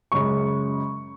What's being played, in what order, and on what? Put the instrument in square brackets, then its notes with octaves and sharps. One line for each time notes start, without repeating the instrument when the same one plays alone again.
[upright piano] F#2 C#3 G#3 C#4 C#6